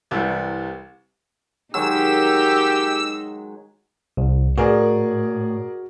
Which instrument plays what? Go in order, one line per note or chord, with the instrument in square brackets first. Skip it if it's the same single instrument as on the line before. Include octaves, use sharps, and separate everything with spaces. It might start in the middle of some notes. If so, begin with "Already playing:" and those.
[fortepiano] C2 C3 E3 G3
[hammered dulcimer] D#3 F#3 G#3 [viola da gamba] D#4 [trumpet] G4 [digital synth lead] E6
[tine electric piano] C2
[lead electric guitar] A2 [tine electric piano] F#4 [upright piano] G#4 A#4 D5